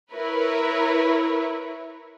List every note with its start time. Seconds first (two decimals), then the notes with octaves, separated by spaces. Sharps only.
0.14 E4 A#4 B4 C#5